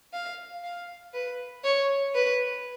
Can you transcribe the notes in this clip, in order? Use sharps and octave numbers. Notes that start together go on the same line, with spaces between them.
F5
F5
B4
C#5
B4